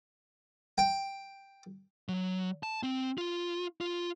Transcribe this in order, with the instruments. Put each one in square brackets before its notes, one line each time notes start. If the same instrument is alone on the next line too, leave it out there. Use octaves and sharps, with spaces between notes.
[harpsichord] G5
[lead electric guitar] F#3
A5
C4
F4
F4